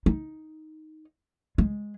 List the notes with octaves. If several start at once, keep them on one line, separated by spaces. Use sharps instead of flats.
D#4
G#3